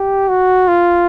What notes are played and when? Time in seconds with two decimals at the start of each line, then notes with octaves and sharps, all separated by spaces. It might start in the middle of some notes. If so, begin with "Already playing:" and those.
Already playing: G4
0.29 F#4
0.68 F4